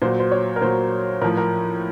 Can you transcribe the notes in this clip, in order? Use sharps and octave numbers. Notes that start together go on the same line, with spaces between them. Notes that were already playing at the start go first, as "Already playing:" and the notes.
A#2 F#3 C5
C5
C#5
A#4
A#2 F#3 C5
A2 F3 A#4
A#4